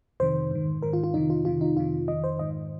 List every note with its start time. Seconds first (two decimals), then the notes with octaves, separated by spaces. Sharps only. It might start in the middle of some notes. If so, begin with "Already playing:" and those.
0.20 F2 C3 D#3 C5
0.51 G#2 D#3
0.82 G#2 D#3 A#4
0.93 F4
1.04 F4
1.14 F2 C3 D#3 D#4
1.30 F4
1.45 F2 C3 D#3 F4
1.61 D#4
1.76 F2 C3 D#3 F4
2.08 F2 D#3 D#5
2.24 C5
2.39 G#2 D#3 D#5